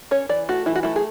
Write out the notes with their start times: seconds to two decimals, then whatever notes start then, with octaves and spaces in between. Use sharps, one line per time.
0.11 C#4 C#5
0.29 E3 D5
0.49 A3 F#4
0.66 E3 E4
0.76 F#4
0.83 A3 E4
0.96 G#4